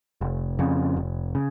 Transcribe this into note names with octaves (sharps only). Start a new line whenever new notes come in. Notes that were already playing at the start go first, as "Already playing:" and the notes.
F1
F2 C#3
F1
C#3